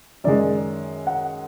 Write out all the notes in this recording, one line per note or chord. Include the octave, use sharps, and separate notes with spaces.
F#2 D#3 G#3 D5
F#5